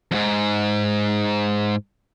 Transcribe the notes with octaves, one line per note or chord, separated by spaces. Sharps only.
F2 G#2